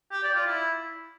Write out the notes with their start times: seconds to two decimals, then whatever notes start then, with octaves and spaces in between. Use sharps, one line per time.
0.12 G4
0.23 D5
0.35 F4
0.46 E4